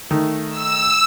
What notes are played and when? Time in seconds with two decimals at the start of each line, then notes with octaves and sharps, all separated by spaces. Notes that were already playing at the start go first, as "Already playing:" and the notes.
0.11 D#3 A3
0.49 E6